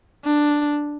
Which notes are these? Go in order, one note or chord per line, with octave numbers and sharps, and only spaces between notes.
D4